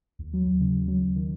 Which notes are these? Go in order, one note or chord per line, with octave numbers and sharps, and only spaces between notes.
D#2
F#3
D#2
C#3
D#2
F#3
D#2
D#3